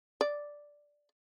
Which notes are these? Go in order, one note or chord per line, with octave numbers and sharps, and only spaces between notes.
D5